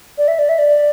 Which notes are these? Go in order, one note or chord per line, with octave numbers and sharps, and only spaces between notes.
D5
E5
D5
E5
D5